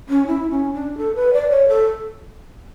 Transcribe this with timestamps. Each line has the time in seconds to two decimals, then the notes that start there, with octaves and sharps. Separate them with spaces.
0.09 C#4
0.27 E4
0.50 C#4
0.74 D4
0.97 A4
1.15 B4
1.33 D5
1.50 C#5
1.68 A4